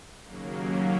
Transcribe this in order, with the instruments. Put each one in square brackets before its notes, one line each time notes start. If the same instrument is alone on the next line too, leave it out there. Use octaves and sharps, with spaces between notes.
[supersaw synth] D#2 C#3 F#3 A#3